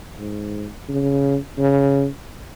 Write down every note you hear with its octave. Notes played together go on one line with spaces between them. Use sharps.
G#2
C#3
C#3